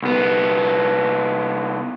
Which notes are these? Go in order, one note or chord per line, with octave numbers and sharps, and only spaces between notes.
C2 B3